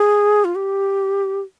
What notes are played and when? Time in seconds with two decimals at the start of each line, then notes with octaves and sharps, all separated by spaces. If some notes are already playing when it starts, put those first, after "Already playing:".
Already playing: G#4
0.45 F4
0.55 G4